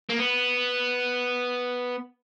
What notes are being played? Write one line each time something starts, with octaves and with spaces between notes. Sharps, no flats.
A#3
B3